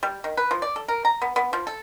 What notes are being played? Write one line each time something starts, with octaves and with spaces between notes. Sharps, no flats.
G3
D#3
B4
F3
D5
A4
A#4
A#5
B3
B3
F3
A4